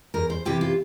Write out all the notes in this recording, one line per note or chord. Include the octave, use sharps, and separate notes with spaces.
E2 A#4
C5
C3 E3 G4
F4